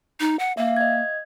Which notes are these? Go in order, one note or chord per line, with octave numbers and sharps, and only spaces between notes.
D#4
F#5
A#3 E5 F5
D#5 G#6